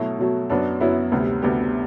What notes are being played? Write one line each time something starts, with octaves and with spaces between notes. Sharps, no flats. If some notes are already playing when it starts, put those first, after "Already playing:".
Already playing: B2 F#3 A3 E4
B2 F#3 A3
F#2 F#3 B3 D4
F#2 F#3 B3 E4
D2 C3 G3 B3
D2 C3 G3 B3 G4